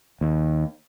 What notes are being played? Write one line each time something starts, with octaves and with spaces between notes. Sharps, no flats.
D#2